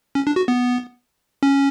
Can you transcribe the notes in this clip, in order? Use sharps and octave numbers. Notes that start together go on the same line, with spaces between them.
C#4
D4
F#4
B3
C#4